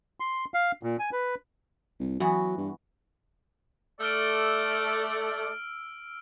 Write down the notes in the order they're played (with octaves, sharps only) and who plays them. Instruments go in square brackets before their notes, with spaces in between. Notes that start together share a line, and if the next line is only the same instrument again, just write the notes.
[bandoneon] C6
F5
A#2
G#5
B4
[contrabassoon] C2
[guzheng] E3 B3 F#4 [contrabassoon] F#3
[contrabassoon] G2
[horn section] A3 A4 D5 [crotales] E6 F6 D7